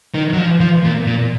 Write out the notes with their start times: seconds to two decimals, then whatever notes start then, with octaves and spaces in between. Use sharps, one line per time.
0.14 D#3
0.33 F#3
0.38 F3
0.61 F3
0.84 A#2
1.07 A#2